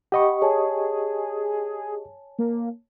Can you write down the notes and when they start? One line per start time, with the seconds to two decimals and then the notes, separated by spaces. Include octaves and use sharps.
0.12 G4 D#5 F#5 B5 C#6
0.42 G#4 C#5 G#5 A5
2.39 A#3